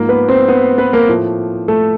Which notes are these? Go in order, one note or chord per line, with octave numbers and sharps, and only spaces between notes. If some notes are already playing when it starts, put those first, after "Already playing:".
Already playing: G#2 F3 A#3 A#4
B3 B4
C4 C5
B3 B4
B3 B4
A#3 A#4
A2 F3 A3
A3 A4